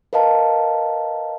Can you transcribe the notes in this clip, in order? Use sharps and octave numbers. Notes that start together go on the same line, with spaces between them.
A#4 B4 D#5 F5 A5 A#5